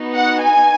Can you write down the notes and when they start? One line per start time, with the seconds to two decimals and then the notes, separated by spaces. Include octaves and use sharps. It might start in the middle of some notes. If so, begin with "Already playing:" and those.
Already playing: B3 D#4 F#4
0.15 F#5
0.43 G#5